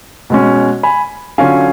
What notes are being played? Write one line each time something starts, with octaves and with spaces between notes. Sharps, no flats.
B2 G#3 C#4
G#5 B5
D3 F#3 C#4 F4 F5 G#5